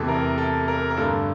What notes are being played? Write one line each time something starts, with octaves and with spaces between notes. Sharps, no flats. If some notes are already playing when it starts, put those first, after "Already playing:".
Already playing: E2 C3 E3 A3 A4
A#4
A4
A#4
A#4
G2 D3 A3 A4